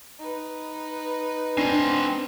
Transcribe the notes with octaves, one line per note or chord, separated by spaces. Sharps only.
D#4 B4
C4 D4 G#5 A#6 C7